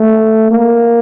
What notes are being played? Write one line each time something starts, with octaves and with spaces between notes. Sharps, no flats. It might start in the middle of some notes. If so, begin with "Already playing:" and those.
Already playing: A3
A#3